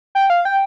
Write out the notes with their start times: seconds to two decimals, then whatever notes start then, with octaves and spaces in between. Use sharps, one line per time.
0.15 G5
0.30 F5
0.45 G5